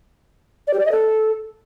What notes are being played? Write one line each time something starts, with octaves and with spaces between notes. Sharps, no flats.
D5
G4
D5
D#5
A4